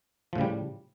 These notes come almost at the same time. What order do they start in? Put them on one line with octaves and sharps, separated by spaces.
F3 A2 C#3 G3